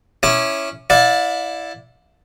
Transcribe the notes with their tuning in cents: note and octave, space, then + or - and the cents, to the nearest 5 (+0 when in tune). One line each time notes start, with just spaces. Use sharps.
C#4 +0 E4 +0 D6 +25
E4 +0 D5 +0 F5 +45